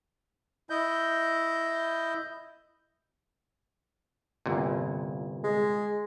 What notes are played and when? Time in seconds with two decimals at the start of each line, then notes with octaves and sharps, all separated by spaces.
0.70 E4 D#5 G6
4.46 G1 C2 A#2
5.44 G#3